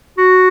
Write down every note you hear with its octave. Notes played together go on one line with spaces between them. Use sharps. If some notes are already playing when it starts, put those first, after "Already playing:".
F#4